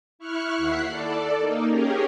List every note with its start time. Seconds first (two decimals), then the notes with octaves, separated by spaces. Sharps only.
0.19 E4 C#6 F6 F#6
0.58 D#2 E4 F#5 B5 F#6 C7
0.90 A4 D5
1.37 A#3 D#4
1.69 C#4 G4 G#4 A#4